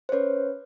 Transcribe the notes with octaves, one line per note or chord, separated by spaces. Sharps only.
C5
C#4 B4 C#5